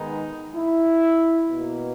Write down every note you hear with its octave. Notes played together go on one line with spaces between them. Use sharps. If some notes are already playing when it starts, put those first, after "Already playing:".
Already playing: D#3 G#3 B3 D#4
E4
B2 A#3